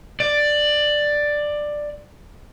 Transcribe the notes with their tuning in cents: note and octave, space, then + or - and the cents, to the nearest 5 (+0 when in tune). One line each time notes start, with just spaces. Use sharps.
D5 +10